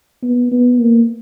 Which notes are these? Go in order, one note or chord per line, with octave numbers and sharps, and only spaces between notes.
B3
B3
A#3